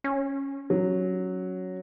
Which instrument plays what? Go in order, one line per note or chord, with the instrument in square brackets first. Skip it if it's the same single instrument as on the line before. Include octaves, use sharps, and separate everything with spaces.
[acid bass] C#4
[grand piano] F#3